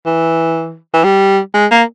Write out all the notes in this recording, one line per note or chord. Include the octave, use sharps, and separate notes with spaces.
E3
E3
G3
G#3
A#3